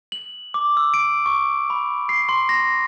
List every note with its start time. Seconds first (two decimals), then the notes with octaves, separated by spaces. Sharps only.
0.12 F#7
0.54 D6
0.77 E6
0.94 D7
1.26 C#6
1.70 B5
2.09 C7
2.29 C6
2.49 A#6